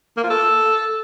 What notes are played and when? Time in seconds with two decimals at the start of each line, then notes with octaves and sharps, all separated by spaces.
0.17 A#3
0.24 F4
0.30 A4